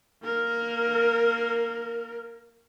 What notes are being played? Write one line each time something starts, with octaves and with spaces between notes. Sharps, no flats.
A#3 A#4